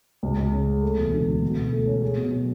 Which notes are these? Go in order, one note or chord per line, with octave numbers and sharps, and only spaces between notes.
C#2
C#2
C#3
G#3
A3
E1
D2
D3
B2
B2
A3
C#4
G#4
B2
F#3